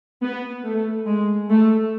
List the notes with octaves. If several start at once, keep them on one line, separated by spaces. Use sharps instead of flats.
B3
A3
G#3
A3